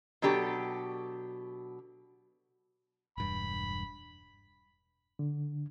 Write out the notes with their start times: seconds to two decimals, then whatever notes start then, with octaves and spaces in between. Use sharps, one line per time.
0.22 B2 F#3 D4 G4 A4
3.18 E1 G2 B5
5.19 D3